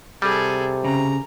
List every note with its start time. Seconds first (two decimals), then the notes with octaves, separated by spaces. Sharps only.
0.22 C3 G3 G#4 A4
0.85 C#3 A#5